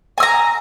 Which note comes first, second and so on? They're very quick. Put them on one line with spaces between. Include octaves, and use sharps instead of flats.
G#5 E6 A#5